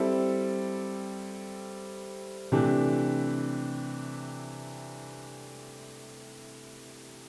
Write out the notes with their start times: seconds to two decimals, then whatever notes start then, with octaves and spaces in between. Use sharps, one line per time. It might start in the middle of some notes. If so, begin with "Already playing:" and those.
Already playing: G3 C4 E4 A4
2.52 C3 E3 A3 D4 G4